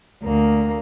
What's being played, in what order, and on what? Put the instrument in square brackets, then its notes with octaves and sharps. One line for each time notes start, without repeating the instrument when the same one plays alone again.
[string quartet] D2 A#3